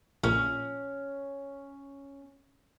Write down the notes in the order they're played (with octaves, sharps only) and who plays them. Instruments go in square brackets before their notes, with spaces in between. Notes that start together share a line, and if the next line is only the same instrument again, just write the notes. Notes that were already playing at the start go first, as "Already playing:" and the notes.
[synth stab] A#1 A#2 [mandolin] C#4